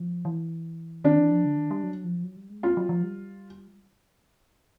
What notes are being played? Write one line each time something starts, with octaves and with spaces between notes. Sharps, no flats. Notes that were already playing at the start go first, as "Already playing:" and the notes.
Already playing: F3
E3
D#3 D4
E3
F3
D3
D#3
G3
F#3
F3
F#3
G3
G#3
A3 F4
F#3
F3
G3